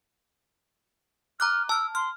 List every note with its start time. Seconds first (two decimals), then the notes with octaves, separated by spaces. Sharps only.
1.40 A#5 D6 F6 F#6
1.69 A5 E6 F6
1.95 C6 F6